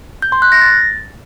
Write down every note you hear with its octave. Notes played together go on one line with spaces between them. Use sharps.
G6
C6
F#6
A#6
A6